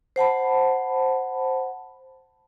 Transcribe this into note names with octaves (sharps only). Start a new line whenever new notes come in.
C5 F#5 A5 B5